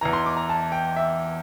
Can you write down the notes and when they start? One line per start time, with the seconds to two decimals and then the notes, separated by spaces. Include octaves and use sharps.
0.01 E2 E3 A#5
0.13 C6
0.26 D6
0.37 A#5
0.49 A5
0.72 G5
0.96 E5